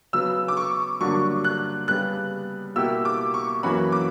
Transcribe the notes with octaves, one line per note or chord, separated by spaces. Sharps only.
C#3 F#3 B3 E6
D6
C#6
G2 D3 F#3 A#3 D4 C#6
F#6
C#3 G3 B3 F#6
B2 A#3 E4 G4 E6
D6
C#6
F#2 E3 A#3 C#4 F#4 B5
D6